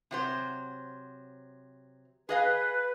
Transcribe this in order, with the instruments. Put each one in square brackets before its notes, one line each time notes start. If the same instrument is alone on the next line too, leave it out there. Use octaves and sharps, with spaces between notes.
[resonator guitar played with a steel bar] C3 F#3 C5
[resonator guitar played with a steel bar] G#4 D#5 F5 [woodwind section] B4